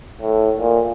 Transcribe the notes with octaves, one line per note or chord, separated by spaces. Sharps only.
A2
A#2